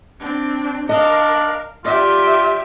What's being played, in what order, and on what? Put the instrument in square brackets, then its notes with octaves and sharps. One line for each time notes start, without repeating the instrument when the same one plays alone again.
[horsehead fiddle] C4 D4
[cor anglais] D4 [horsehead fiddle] A#4 F5 [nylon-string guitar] D#5
[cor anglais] F4 [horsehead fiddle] G4 E5 [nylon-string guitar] D5